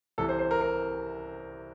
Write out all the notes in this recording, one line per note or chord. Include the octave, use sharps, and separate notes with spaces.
C2 C3 E3 A4
C5
C5
A#4
A#4